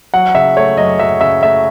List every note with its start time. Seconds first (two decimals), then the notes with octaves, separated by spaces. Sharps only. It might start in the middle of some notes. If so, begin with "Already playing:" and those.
0.14 F#3 F#5
0.35 C#3 E5
0.57 A3 C#5
0.77 F#2 D#5
0.99 F#3 E5
1.21 C#3 E5
1.42 A3 E5